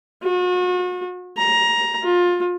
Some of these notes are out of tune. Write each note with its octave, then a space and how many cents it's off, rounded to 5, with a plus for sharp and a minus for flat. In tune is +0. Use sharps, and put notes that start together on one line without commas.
F#4 -40
A#5 +15
F4 +25